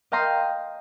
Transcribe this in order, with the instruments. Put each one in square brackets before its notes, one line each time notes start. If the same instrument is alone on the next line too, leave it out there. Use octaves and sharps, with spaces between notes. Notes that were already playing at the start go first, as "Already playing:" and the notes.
[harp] D#5 F5 G5 A#5 C6 D#6